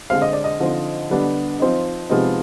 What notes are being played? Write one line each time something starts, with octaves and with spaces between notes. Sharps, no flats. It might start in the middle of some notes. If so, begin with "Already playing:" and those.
D3 G#3 C4 F5
D#5
D5
D#5
D3 F3 C4 D#4
D3 G3 B3 D4
F3 C4 D#4
C3 F3 G#3 B3 D#4